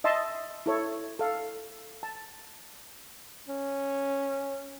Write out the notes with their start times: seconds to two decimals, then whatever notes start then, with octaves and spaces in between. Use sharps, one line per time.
0.04 D#5 E5 A5 C6 D#6
0.66 E4 A4 C#5
1.19 A4 F5
2.03 A5
3.48 C#4